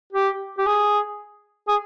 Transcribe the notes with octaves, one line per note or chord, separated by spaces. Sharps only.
G4
G4
G#4
G#4